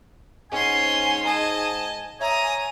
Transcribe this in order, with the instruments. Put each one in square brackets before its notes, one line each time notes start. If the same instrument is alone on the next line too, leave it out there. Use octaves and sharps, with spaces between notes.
[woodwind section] G#2 G#5 [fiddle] C#4 C6
[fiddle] D#5 A5
[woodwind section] C#5 E5 G#5 [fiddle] A#5 D#6